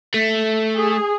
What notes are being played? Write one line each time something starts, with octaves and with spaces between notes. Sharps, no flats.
A3
G#4